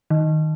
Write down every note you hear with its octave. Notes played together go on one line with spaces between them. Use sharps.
D#3